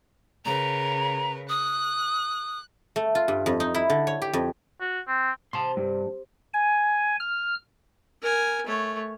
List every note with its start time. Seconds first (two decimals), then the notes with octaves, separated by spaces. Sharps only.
0.45 C#3 A#4 B4 A#5
1.49 D#6 F#6
2.96 A3
3.15 F4
3.28 G2
3.46 F2
3.60 D#4
3.74 E4
3.90 D3
4.07 C#5
4.22 G4
4.33 F2
4.81 F#4
5.08 C4
5.53 C3 A5 C6
5.77 G2
6.54 G#5
7.20 F6
8.22 A#4 G#5
8.66 A3 C#5